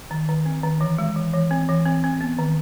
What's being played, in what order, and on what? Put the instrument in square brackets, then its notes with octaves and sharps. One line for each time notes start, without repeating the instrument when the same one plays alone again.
[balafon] D#3
D#3
C4
D#3
E3
G#3
E3
E3
C4
E3
C4
C4
B3
D#3